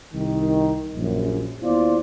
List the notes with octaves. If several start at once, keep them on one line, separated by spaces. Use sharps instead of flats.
C2 D#3
A#1 F#2
D#2 B3 E4 F4 C5 D5